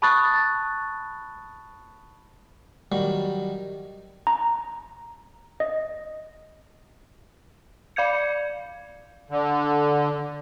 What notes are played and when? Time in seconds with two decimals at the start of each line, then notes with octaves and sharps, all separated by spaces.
0.02 A5 B5 C#6 D#6 F#6 A6
2.92 D#3 F#3 G3
4.27 A#5
5.60 D#5
7.96 D5 F5 G6 G#6 C#7
9.30 D3